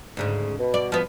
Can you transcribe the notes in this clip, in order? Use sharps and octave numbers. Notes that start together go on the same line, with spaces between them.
D2 G#2 C#3
B2
D5
F3 B3